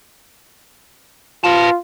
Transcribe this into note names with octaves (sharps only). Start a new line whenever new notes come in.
F4 B4 A5